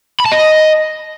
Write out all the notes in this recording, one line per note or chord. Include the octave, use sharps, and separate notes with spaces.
B5
A5
D#5